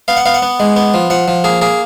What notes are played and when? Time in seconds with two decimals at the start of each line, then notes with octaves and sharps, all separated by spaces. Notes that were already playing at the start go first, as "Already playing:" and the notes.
0.08 B3 F5
0.17 F#5
0.26 B3 F5
0.34 F#5
0.42 B3
0.60 G#3
0.76 B3
0.94 F3
1.10 F3 F#5
1.28 F3
1.44 A#3 G#4
1.62 A#3 G#4